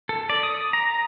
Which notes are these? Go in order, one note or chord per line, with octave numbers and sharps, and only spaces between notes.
A4
D5
D#6
A#5